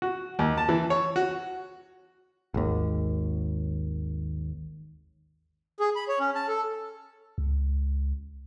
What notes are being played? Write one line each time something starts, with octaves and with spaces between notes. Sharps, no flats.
F#4
D#2
A5
E3
C#5
F#4
G#1 D#2
G#4
B5
C#5
C#4
A5
A4
C#2